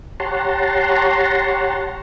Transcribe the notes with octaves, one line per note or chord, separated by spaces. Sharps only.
G4 C#5 F#5 A5 A#5 C6